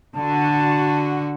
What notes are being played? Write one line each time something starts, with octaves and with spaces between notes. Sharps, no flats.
D3 F#4 A5